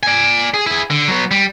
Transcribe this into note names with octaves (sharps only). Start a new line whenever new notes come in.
D5 G#5
G#4
E4 G#4
D3
F#3 B3
G3